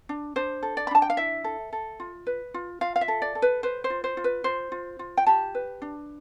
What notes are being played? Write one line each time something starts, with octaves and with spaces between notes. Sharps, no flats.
D4
D4 C5
A4
D5
B5
D4 A5
G5
F5
E4 E5
A4
A4
F4
B4
F4
F4 F5
F5
E5
A4
D5
A4
B4
B4 C5
C5
F4
C5
F4
B4
F4 C5
F4
F4
G5
G4 A5
B4
D4